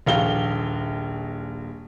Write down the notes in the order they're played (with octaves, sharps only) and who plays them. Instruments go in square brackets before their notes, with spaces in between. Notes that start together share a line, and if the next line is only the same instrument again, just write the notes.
[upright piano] D#1 A#1 F5 G7